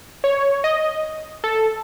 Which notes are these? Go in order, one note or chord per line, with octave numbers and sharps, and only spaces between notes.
C#5
D#5
A4